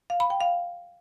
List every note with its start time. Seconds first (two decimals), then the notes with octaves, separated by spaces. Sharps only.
0.10 F5
0.20 B5
0.30 G5
0.40 F5